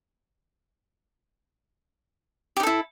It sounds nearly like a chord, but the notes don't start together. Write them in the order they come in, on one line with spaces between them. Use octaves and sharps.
G4 D#4 A4 E4